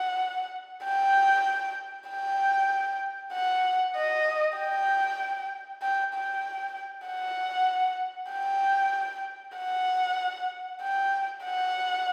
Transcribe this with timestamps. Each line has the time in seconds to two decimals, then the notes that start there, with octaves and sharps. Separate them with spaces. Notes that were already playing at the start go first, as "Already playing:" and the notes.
Already playing: F#5
0.85 G5
2.09 G5
3.33 F#5
3.96 D#5
4.58 G5
5.82 G5
6.15 G5
7.07 F#5
8.32 G5
9.58 F#5
10.82 G5
11.44 F#5